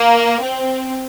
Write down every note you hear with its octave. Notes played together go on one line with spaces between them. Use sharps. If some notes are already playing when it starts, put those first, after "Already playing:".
Already playing: A#3
C4